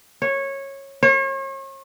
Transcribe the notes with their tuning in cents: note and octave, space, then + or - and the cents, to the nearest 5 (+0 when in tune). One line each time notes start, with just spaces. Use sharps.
C#5 -15
C#5 -40